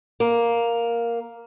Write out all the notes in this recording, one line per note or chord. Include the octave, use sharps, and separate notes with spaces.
A#3